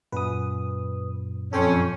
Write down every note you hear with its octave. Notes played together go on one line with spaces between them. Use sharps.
F#2 A#2 B4 D#6
F2 C#4 A4 G5 C6